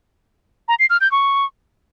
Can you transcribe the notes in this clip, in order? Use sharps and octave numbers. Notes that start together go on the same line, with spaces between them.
A#5
C7
F6
G6
C#6